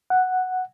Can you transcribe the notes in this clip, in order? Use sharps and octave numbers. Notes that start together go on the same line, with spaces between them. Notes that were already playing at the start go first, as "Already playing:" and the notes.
F#5